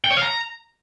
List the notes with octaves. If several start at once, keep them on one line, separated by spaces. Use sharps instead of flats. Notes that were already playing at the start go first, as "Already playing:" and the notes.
G5
C#5
F5
A#5